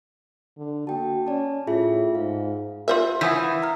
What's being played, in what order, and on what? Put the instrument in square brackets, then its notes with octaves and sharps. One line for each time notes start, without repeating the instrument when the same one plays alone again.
[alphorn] D3
[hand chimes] A#3 G5 A5 [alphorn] F#4
[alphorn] C#4 [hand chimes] D5 A5
[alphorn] A2 [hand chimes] F4 G#4 E5
[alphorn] G#2 [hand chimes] F5
[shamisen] F4 C5 E5 [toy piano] A#4
[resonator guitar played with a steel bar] E3 [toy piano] F5 D#6 [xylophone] F#5 G#5 G6
[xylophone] A#5 F6